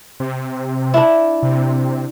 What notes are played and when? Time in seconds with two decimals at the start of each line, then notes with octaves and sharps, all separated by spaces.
0.20 C3
0.94 D4 E4
1.43 C3